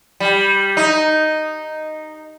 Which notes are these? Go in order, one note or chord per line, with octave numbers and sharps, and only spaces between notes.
G3
D#4